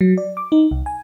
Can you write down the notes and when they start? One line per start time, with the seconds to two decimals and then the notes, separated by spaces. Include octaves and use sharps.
0.01 F#3
0.17 D5
0.37 D6
0.52 D#4
0.71 C2
0.86 G#5